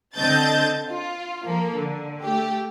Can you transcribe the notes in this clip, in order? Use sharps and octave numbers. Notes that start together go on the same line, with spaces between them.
D3 C4 D#5 A5 G6 A6
F4
F3 A#3 A4
D3
A3 G4